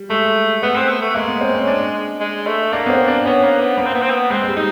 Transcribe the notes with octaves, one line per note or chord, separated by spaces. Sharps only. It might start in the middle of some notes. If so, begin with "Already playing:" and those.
Already playing: G3
G#3 A3
A3 B3
C4
B3
A3
G#3 A#3
B3
C4
C#4
D4
G#3
A3
A#3 D4
B3
C4
D4
B3 C#4
A#3
B3
A#3 B3
C4
B3
C4
B3
G#3 C4
G#3
G3
D#4